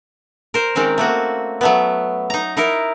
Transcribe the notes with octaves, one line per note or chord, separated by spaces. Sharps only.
A#4 C5
D#3 G#3 C4 C#4
A3 A#3 F#4
F#3 A3 B3
D#4 A#5
D#4 E4 A#4